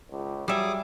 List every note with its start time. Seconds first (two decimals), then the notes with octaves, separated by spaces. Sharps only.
0.11 C#2
0.48 F#3 G3 G#4 E5 D6 D#6